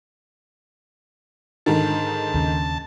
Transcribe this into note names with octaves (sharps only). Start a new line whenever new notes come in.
G#2 D3 D#3 A5
D#2 C#3